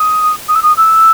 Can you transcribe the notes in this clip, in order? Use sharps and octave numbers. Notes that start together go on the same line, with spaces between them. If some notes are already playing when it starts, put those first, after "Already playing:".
Already playing: D#6
D#6
E6
D#6
E6